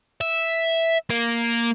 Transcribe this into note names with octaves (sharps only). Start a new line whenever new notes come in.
E5
A#3